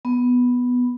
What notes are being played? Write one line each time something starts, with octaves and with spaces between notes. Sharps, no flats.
B3